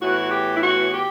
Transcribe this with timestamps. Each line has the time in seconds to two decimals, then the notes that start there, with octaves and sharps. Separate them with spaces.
0.01 A2 E3 B3 F#4
0.32 G4
0.57 E4
0.62 F#4
0.94 G4